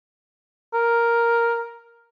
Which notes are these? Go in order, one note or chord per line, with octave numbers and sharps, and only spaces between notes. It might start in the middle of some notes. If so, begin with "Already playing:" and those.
A#4